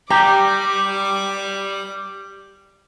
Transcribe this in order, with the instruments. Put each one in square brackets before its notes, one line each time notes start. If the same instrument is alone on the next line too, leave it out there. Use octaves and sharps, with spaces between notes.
[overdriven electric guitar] G3 [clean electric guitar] G4 [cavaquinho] A#5 [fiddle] D6